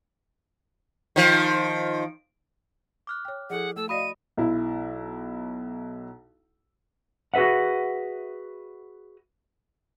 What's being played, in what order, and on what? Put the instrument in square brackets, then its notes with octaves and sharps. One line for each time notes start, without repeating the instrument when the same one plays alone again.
[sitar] D#3 F3
[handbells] D6 F6 F#6
[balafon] C#5 G5
[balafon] F3 E4 A4 [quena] G#4 [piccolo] F#5
[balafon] A3 [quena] A4 [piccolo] E6
[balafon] F#4 D5 D#5 [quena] F5 [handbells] B5 D#6 A#6 [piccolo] D#7
[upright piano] B1 E4
[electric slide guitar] F#4 G#4 B4 E5 F#5